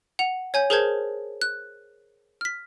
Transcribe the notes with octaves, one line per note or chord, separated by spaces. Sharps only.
F#5 F7
C#5 G#5 G6
G#4 A#4 C5 A5 G6 G#6
F#6
F6 B6